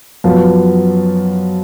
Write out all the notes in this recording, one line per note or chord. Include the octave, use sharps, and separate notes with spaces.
F#2 F3 B3